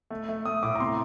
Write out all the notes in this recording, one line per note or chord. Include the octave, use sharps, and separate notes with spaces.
A3
A3
A3 D#6
A2 D6
A#5
C3 C6